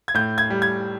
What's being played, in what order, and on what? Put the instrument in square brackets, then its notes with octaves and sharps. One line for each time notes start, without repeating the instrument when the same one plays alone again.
[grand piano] G#6
A2 G6
G#6
G3
G#6